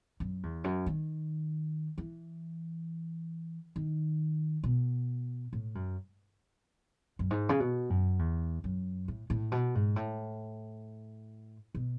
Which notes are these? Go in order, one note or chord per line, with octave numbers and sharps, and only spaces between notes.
F#2
E2
F#2
D#3
E3
D#3
B2
A2
F#2
F#2
G#2
C#3
B2
F#2
E2
F#2
A2
A2
B2
G#2
A2
B2